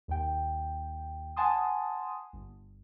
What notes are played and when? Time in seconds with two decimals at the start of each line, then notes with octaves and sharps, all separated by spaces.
0.08 D#2 G5
1.36 F#5 G#5 A5 C6 D#6
2.33 G1